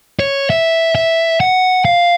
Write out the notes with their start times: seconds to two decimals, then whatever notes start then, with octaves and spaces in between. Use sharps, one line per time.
0.19 C#5
0.50 E5
0.95 E5
1.40 F#5
1.85 F5